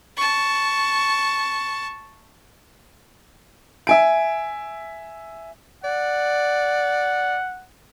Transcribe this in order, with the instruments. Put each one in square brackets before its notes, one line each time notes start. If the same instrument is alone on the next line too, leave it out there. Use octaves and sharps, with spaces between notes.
[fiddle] A5 C#6
[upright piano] E5 G#5 D7
[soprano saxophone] D5 [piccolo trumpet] F#5